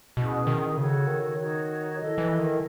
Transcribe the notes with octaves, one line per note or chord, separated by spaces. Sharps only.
B2 C#4 E4 G#4
D#3
C#3 F#4 A4 C#5
D#3
D#4 F#4 C#5
E4 A4 D#5
E3
D#3